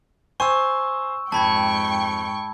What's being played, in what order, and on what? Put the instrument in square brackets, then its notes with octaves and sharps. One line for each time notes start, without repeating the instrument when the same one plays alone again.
[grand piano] C5 G#5 [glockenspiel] C#6 E6
[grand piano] F2 [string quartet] G#2 G5 C#6 [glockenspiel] A5 B5 G#6